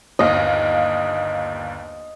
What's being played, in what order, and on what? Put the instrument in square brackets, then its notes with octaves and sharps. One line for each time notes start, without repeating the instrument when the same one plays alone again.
[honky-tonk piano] G1 D#2 F5 [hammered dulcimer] D#5